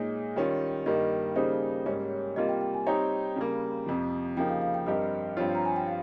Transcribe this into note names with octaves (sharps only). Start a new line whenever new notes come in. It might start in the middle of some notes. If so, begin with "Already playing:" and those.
Already playing: A#2 G#3 D#4 C#5
D#3 G3 C#4 F4
G2 D#3 G3 A#3 D#5
C#3 G3 A#3 D#4 G#4 C5
G#2 G3 A#3 C#4 C#5
C3 G3 A#3 F4 D#5
G5
G5
G#5
G3 C4 D#4 G4 C#5 A#5
C#3 G3 A#3
F2 C3 F3
C#3 F3 A#3 D#4 G4 G5
F5
F5
G5
G2 G3 C4 G4 A#4 D#5
G2 F3 C4 F4 C#5
A#5
G#5
G5
F5